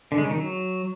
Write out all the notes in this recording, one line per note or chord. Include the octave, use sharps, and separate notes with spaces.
D3
G#3
C#3
D#3
F#3